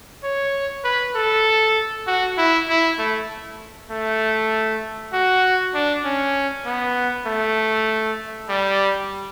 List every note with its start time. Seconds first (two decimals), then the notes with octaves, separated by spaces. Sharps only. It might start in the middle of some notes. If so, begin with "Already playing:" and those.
0.24 C#5
0.84 B4
1.15 A4
2.07 F#4
2.38 E4
2.68 E4
2.98 A3
3.91 A3
5.13 F#4
5.74 D4
6.05 C#4
6.66 B3
7.26 A3
8.49 G3